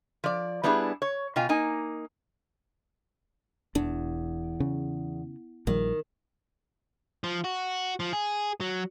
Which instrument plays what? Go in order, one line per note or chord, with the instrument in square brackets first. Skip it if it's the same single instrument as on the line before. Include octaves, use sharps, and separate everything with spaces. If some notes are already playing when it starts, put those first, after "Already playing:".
[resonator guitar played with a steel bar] F3 D5
G3 B3 D4 E4 F#4 G#4
C#5
B2 F4 G5 G#5
A#3 D#4 G#5
[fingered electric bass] E1 D4 [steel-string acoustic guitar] E2
[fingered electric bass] C#3
[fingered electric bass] A#1 F3 G3 [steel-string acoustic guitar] D#3
[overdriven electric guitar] F3
F#4
F3
G#4
F#3